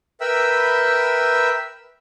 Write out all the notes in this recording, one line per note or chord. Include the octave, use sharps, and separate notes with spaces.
A#4 B4 E5 G5 B5 E6